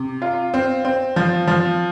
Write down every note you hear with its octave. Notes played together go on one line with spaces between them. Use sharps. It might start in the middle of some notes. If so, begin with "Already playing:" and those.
Already playing: C3
F4
C4
C4
F3
F3